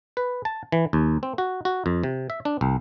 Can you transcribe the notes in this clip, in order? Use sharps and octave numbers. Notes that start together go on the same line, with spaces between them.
B4
A5
E3
D#2
C4
F#4
F#4
F2
C3
E5
D4
C2